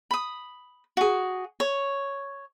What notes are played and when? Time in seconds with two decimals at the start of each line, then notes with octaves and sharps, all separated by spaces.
0.11 B5 D#6
0.97 F#4 G#4
1.60 C#5